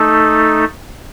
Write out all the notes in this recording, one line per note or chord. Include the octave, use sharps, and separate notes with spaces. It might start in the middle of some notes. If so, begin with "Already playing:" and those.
Already playing: A3 D#4 A4